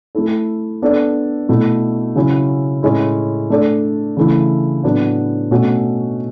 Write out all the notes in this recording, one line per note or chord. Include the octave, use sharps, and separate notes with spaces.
A3 E4 A4
B3 D4 A4 D5
B2 A3 E4
C#3 F#3 C#4 E4
A2 G#3 C#4 E4
A3 D4 A4 D5
C#3 E3 A3 E4
A2 F#3 B3 D4
B2 A3 C#4 F#4